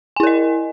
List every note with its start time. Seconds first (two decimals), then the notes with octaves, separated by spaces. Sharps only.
0.16 G#5
0.20 E4
0.23 A#4
0.27 D#5